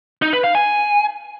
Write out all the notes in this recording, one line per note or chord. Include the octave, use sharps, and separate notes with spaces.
D#4
B4
F5
G#5